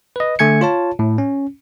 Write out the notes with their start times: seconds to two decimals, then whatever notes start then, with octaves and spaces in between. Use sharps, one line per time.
0.16 B4 D#5
0.39 D3 A3 G#5 G#6 C#7
0.61 F4 C#5 A5
0.99 A2
1.18 C#4